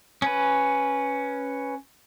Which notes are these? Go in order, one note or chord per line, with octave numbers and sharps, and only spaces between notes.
C#4 B4